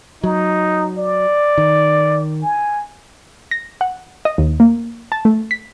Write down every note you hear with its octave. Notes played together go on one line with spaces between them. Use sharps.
F#3 D#4
D5
D#3
G#5
A#6
F#5
D#5
D#2
A#3
A5
A3
B6